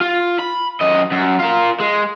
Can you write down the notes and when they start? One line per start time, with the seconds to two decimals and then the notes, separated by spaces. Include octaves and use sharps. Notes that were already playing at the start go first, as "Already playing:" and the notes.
0.01 F4
0.40 B5
0.81 F#2 D#5
1.12 F#2
1.40 F4 A#4
1.80 G#3